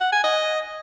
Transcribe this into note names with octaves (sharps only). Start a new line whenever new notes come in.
F#5
G#5
D#5